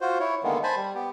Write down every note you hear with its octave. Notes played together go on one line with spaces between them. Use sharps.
F4 F#4 C5
E4 C#5
D3 D#3 G#3 A#3 B3
C5 G#5 A5 B5
G3
B3 G4